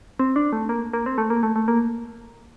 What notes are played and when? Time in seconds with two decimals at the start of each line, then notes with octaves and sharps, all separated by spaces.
0.19 C4
0.36 D4
0.53 A3
0.69 A#3
0.93 A#3
1.06 C4
1.18 A3
1.30 A#3
1.43 A3
1.56 A3
1.68 A#3